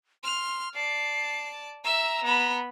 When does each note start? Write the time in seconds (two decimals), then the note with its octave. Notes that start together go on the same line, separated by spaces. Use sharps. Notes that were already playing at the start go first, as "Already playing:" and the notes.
0.24 C6 F6
0.75 D5 A5 C7
1.84 E5 A#5 E6
2.24 B3 B5